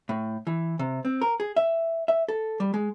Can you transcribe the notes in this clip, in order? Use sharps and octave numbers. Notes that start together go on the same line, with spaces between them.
A2
E3
C3
C4
A#4
G#4
E5
E5
A4
G3
G#3